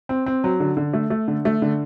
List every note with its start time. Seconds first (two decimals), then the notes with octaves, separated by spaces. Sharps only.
0.09 C4
0.26 C4
0.44 F#3
0.60 D3
0.77 D3
0.93 A3
1.10 A3
1.28 D3
1.45 A3
1.62 D3